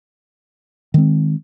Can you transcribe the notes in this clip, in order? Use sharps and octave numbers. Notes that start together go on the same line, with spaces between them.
D#3 G#3 C4